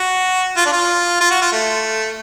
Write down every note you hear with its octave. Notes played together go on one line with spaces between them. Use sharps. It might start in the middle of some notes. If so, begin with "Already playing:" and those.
Already playing: F#4
F4
D4
F4
F4
F#4
F4
A3